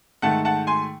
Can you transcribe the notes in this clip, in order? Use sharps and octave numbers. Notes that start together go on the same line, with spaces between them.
G#2 D#3 A3 F#5 A5
F#5 A5
G#5 C6